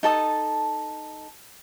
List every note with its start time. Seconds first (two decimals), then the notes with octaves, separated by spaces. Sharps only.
0.03 D#4 A4 A5 D#6